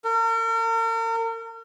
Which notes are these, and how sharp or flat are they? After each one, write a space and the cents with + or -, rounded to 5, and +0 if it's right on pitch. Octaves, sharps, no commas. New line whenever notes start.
A#4 -40